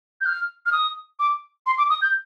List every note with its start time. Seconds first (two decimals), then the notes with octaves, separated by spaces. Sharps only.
0.21 G6
0.26 F6
0.66 F6
0.72 D#6
1.19 D6
1.66 C6
1.78 D6
1.90 D#6
2.01 G6